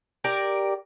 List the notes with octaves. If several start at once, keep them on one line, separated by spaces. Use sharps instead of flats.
G4 A#4 D5